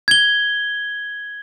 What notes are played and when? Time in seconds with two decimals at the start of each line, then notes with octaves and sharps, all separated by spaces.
0.08 G#6 G7